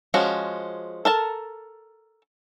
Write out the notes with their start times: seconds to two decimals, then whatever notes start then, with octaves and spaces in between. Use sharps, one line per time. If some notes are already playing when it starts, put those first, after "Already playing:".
0.14 F3 G#3 C#4 F#4
1.05 A4 A#4 A5